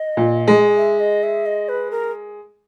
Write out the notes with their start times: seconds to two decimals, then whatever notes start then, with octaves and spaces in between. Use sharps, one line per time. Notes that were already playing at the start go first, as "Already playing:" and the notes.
Already playing: D#5
0.17 A#2
0.48 G#3
0.77 E5
1.00 D#5
1.23 E5
1.46 D#5
1.69 B4
1.91 A#4